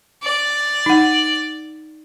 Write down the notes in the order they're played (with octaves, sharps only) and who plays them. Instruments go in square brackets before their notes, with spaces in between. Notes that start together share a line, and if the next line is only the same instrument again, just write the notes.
[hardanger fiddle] D5
[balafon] D#4 F#5